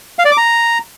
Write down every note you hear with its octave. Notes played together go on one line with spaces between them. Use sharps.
F5
D5
D6
A#5